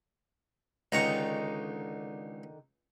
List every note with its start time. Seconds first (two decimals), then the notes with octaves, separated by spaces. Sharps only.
0.92 C#2 D3 D#3 D#4 A#5 C#6